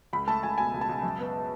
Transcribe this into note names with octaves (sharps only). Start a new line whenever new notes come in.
C#2 B5
A3 A5
C#2 G#5
B2 G#5
C#2
A5
C#2
F#2
B3